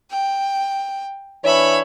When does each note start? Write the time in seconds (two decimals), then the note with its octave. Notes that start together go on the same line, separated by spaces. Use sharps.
0.12 G5
1.43 E3 D4 C#5 E5 B5